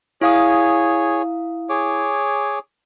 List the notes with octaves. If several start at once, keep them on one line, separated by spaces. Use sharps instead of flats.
E4 G#4 C#5 F5 D#6
G#4 C#5 D6